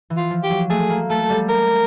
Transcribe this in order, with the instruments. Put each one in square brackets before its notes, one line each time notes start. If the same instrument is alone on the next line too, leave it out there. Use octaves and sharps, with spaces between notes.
[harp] E3
[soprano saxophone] F4
[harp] F3
[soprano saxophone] G4
[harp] F#3
[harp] A3 [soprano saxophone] G#4
[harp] A#3
[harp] A3 [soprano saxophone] A4
[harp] G3
[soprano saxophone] A#4